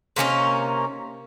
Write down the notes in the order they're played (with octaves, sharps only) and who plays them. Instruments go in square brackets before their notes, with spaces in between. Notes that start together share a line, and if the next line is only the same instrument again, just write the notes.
[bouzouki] C3 A#3 C#4 D#4